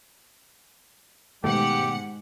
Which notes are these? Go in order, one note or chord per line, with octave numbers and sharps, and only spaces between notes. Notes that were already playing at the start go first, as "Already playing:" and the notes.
G#2 B2 D#3 A3 G4 F#5 C#7